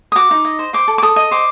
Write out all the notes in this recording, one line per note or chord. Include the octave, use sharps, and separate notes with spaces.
D#6
F#4 D6
D#4
D#5
C5
C5 D6
A4
D6
A4 D#6
D#5
C5 D6